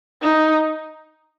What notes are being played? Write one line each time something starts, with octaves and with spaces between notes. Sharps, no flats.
D#4